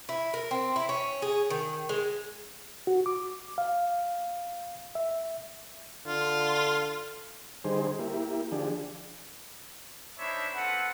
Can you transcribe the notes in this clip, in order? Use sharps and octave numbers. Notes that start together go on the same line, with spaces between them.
E4
A#4
C4
E4
C#4
G#4
D#3
G#3
F#4
D6
F5
E5
D3 F4
D3 G3 D#4 G#4 C5
A#3 E4 G4
D3 F3 D4 G4 G#4
D4 D#4 C5 C#5 E5 B5
C4 F4 A4 B4 F#5